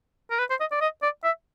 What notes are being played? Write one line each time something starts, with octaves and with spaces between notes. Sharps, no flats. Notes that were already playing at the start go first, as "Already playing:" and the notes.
A#4
B4
C5
D#5
D5
D#5
D5
E5